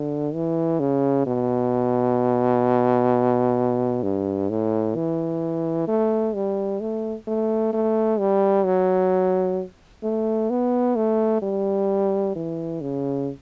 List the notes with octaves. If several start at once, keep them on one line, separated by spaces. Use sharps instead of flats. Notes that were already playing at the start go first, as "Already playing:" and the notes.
Already playing: D3
E3
C#3
B2
G2
A2
E3
A3
G3
A3
A3
A3
G3
F#3
A3
B3
A3
G3
E3
C#3